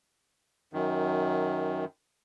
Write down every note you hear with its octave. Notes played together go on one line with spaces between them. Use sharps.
F#2 D#3